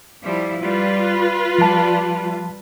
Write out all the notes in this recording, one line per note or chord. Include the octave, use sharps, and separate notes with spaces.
F3 G3 E4
G3 F4 B4
F3 G3 A5